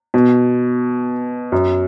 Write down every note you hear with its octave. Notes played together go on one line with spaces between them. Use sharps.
B2
F#2